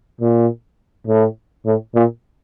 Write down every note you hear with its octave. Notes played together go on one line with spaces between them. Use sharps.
A#2
A2
A2
A#2